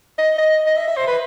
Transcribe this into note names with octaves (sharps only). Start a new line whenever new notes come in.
D#5
D#5
D#5
E5
E5
C5
B4